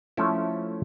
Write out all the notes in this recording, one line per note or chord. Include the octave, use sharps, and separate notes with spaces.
F3 A3 C#4 E4 A4